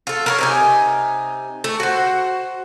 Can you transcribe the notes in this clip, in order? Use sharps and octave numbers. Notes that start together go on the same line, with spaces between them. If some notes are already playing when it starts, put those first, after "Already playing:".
F4 A4
A#4 B4 C#5
C3 D#4 G#5
A3
F#4 C5